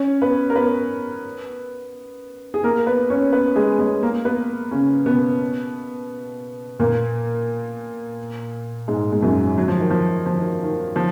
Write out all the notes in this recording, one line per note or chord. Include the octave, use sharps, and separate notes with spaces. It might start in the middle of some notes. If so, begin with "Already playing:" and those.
Already playing: C#4 C#5
B3 B4
A#4
B3 B4
G#4
A#3 A#4
A#4
B3 B4
C#4 C#5
B3 B4
G#3 G#4
G#3 G#4
A#3 A#4
B3 B4
C#3 C#4
B2 B3
A#2 A#3
G#2 G#3
G#3
F#2 F#3
F#3
F3
D#3
F3
F3
D#3
D#3
F3